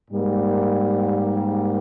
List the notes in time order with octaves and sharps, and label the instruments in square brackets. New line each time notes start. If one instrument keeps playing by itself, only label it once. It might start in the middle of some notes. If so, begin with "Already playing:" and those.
[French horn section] G#2 G3 A#3